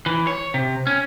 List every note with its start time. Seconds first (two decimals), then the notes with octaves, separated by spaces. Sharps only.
0.06 E3
0.27 C#5
0.54 C3
0.87 C#4